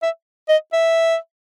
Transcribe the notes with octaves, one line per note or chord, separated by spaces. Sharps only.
E5
D#5
E5